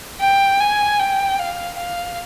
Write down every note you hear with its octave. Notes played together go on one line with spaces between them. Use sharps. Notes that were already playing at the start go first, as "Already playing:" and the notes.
G5
G#5
G5
F5
F5